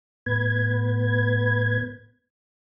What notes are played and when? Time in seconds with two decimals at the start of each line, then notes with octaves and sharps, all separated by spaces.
0.26 A2 B3 B4 G#6